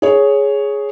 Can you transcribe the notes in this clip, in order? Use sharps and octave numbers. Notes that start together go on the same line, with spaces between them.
G#4 C#5